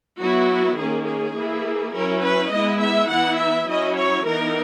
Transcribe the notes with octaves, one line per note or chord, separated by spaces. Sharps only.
F#3 B3 E4 F#4
D#3 A#3 C#4 G#4
G#4
E3 A#3 E4
F#3 C#4 E4 A#4
B4
G#3 B3 E4 D#5
E5
E3 B3 E4 F#5
E5
F#3 C#4 E4 D#5
C#5
E3 B3 D#4 A#4